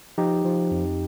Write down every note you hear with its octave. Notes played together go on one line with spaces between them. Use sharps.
F3 D#4 G4
F3
F2